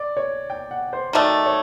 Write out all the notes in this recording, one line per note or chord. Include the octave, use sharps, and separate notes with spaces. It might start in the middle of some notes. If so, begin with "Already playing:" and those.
Already playing: D5
C#5
G5
F#5
C5
D#3 F#3 A3 D5
C#5